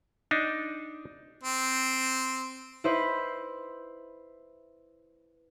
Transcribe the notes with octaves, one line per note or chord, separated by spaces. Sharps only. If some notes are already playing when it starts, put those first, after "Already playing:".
D4 D#4
C4
E4 B4 C5 D#5 E5